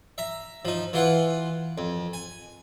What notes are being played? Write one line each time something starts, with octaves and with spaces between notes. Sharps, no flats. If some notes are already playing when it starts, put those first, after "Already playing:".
E5 A#5
F3 D#4
E3 F4 F#5
F2
G#5